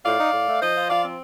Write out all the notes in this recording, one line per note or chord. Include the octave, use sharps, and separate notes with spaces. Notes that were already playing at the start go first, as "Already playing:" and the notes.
A2 D5 F5
D#4
A2
A3
F3 C5 D#5
F4
F3 D5 F5
C4